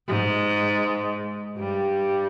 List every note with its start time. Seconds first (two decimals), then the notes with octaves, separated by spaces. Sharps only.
0.08 G#2 G#3
1.58 G2 G3